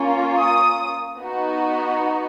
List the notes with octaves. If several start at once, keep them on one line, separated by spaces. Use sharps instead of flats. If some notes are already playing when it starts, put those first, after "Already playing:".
Already playing: A#3 C#4 F4
D#6
B3 D#4 F#4